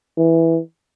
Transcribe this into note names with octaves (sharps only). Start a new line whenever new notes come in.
E3